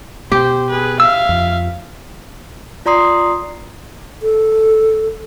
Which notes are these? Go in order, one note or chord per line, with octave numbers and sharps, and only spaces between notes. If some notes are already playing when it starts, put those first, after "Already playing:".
B2 G4 C5
G#4 B4
E5 F5 E6
F2 F3
F4 D5 A#5 C6 D#6 C7
A4